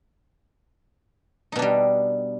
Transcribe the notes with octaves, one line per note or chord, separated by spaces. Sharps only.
B2 G3 D4 D#4